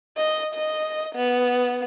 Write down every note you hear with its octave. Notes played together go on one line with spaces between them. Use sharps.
D#5
D#5
B3